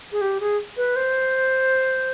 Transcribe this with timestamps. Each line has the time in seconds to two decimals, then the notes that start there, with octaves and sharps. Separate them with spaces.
0.12 G#4
0.21 G4
0.40 G#4
0.77 B4
0.96 C5